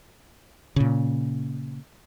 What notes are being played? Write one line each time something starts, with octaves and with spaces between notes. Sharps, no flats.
A#2 C#3